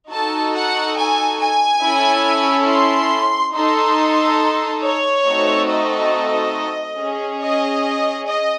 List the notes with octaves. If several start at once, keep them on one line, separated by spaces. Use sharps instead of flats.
D#4 F#4 A4 A5
F#5
G#5
G#5
C#4 E4 A4
C6
D#4 A4 C6
C#5
A3 C4 D#4 F#4 A4
D#5
C#4 G#4
D#5
D#5